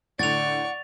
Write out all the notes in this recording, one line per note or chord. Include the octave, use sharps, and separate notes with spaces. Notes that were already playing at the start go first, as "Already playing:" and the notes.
A2 D3 D5 F#5 C#6 A6 F7